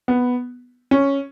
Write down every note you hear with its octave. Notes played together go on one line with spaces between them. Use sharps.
B3
C#4